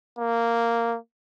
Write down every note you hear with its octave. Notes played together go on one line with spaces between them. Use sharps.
A#3